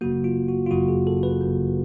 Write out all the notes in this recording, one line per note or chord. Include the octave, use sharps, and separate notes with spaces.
G1 F#2 C#3 F#3 A#3 F#4
F4
F#4
F4
G1 F#2 C#3 F#3 A#3 F#4
G#4
A4
B4
G1 F#2 C#3 F#3 A#3